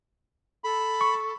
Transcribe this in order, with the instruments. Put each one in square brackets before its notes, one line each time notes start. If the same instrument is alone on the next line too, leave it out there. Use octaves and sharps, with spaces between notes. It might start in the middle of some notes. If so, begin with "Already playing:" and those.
[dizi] A4 [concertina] B5
[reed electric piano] C#6